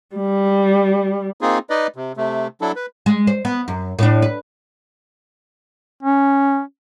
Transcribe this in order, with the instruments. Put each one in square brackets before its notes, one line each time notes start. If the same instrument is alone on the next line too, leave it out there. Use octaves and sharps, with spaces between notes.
[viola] G3
[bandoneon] A#3 C4 D#4 F4 G#4
D#4 B4 D5 D#5
C3
C3 A3
F#3 D4 E4 A4
B4
[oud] G#3
C5
B3
F#2
A2 D4
B4
[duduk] C#4